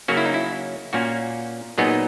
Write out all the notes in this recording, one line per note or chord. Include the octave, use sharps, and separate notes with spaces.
C#3 F#3 A#3 C#4 F#4
E4
D#4
E4
A#2 A#3 C#4 F#4
A#2 F#3 B3 D#4 G#4